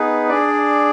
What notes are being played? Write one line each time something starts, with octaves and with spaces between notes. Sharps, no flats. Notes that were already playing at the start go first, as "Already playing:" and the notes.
Already playing: B3 D#4 G#4 B4
D4 G#4 D5